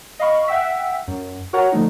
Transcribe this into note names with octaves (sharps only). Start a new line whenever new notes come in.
D#5 F5 B5 C#6
E5 F#5 G5 E6 B6
F#2
F#4 A#4 C#5 F#5 A#5
D3 F3 A3 D#4